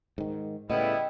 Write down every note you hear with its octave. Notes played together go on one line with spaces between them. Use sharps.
G#2 D#3
A2 C#3 G3 B3 E4 D#5 G5